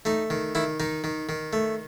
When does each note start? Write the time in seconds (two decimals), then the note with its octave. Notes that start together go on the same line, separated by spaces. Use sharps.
0.05 A3 D#4
0.30 D#3
0.55 D#3 E4
0.80 D#3 D#4
1.04 D#3
1.29 D#3
1.53 A3